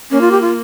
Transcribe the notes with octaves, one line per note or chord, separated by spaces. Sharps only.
A#3 C#4
F4
G4
F4